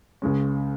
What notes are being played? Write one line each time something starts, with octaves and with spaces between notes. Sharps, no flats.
C#2 C#3 G#3 C#4